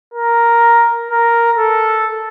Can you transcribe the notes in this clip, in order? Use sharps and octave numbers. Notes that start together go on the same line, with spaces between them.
A#4
A#4
A4